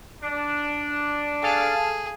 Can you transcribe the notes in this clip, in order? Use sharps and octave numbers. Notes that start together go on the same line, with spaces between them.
D4
G#4 A4 F5 A5